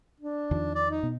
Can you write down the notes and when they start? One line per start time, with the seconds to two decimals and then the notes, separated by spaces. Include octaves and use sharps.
0.20 D4
0.51 E2 D#3 F3
0.75 D5
0.90 D#4
1.03 B2